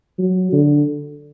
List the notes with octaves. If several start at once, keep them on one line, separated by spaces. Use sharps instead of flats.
F#3
D3